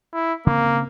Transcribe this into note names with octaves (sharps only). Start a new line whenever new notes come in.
E4
C#3 A#3 C4